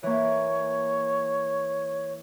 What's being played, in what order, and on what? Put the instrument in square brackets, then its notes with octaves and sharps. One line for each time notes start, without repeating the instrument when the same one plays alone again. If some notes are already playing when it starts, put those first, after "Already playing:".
[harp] E3 A#3 [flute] C#5